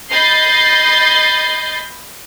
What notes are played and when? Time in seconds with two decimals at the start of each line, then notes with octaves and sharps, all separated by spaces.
0.11 D#5 B5 G6 A6 C7